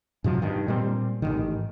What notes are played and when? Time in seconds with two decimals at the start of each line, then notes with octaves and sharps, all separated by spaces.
0.24 G#2 C3 F3 F#3
0.42 G2 D#3
0.68 A#2 G3 G#3 C4
1.22 A1 G#2 D3 D#3